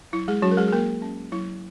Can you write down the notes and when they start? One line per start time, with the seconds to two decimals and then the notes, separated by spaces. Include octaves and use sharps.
0.13 F#3 E4
0.28 G#3 G#4
0.42 F#3 C#4 F#4
0.51 A#4
0.58 G#3 G#4
0.68 G#4
0.72 F#3 A#3 A#4
1.02 C#4
1.32 F#3 E4